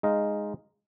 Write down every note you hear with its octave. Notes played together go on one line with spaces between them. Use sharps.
G#3 D#4 D#5 F5